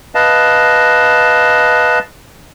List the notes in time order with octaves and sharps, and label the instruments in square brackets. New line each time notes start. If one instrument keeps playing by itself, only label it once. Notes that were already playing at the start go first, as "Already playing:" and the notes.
[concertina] B4 D#5 F5 A5